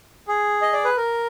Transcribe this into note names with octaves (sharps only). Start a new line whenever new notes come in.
G#4
D#5
D5
B4
A#4